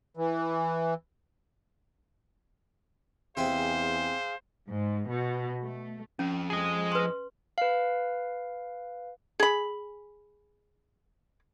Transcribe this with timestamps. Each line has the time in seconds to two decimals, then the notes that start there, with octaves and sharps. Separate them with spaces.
0.17 E3
3.37 E2 C3 C4 G#4 C5 F5 G#5
4.70 G#2
5.08 B2
5.61 A3
6.19 F2 C#4
6.50 G#4 D#5
6.92 B4 C6
7.58 B4 F5
9.40 G#4 B5